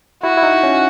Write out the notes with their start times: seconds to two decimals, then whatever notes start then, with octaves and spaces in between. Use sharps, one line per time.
0.23 E4 F#4
0.37 E4
0.43 D#4
0.63 C#4